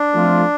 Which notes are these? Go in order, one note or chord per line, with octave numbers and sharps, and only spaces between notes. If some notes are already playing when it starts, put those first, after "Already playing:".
Already playing: D4
F3 A3 C4 F4